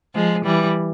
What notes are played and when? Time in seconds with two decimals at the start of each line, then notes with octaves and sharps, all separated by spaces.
0.14 F3 G#3
0.45 E3 G3